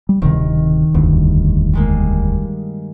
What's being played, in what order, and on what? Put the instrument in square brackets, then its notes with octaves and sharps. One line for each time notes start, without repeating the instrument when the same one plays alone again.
[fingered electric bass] G3
[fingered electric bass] D1 C3 [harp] D#3
[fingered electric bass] E1 D2 [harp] G2
[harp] G3 G#3 A#3